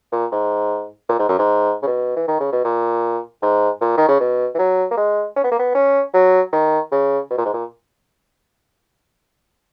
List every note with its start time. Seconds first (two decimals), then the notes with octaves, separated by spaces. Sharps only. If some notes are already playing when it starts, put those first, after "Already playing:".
0.12 A#2
0.32 G#2
1.09 A#2
1.19 G#2
1.29 F#2
1.39 G#2
1.82 C#3
1.87 B2
2.16 E3
2.28 D#3
2.40 C#3
2.52 B2
2.64 A#2
3.42 G#2
3.81 A#2
3.97 D#3
4.08 C#3
4.20 B2
4.54 E3
4.58 F#3
4.91 A#3
4.97 G#3
5.36 C#4
5.44 B3
5.51 A#3
5.59 B3
5.75 C#4
6.14 F#3
6.53 D#3
6.92 C#3
7.30 B2
7.38 A#2
7.45 G#2
7.53 A#2